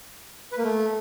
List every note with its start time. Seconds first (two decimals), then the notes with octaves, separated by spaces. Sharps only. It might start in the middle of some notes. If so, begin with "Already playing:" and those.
0.52 B4
0.58 A#3
0.63 A3